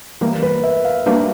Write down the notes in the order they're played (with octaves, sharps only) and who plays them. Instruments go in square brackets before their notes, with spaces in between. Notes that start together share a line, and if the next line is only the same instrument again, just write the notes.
[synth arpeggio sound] E3 G3 A#3 [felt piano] A#4
[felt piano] B4
E5
F5
[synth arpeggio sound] G3 A#3 D4 F#4 B4